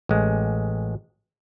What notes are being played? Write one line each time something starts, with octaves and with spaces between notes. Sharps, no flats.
A1 G#3